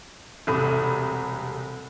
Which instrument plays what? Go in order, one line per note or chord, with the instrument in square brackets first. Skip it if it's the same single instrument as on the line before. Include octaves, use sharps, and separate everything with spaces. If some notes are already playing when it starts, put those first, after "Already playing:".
[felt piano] E1 C2 A3 B5 D#6